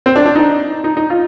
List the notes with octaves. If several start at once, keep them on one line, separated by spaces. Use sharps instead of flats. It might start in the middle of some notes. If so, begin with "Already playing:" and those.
C4
D4
D4
D#4
D#4
D#4
F4